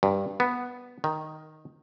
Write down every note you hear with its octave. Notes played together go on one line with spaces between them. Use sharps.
G2
B3
D#3